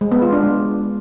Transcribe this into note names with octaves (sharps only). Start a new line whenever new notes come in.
G#3
B3
F4
D4
G#3